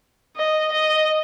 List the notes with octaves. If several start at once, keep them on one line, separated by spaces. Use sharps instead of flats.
D#5
D#5